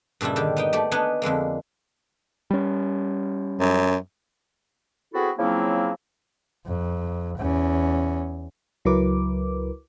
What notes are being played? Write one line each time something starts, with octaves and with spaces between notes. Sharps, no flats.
G2 A#2 C#3 G3 E4
D3 D#3 G4
B3 D#4 G5
A3 G4 D5
B3 D4 D#4 B4 F#5 G#5
F2 D3 G#3 A#3
G3 C#4
F#2
B3 C4 E4 F#4 G#4 A4
C#3 F3 F#3 A#3 C4 E4
F2
E2 C#4
C#2 F#3 E4 A#4 B4 D6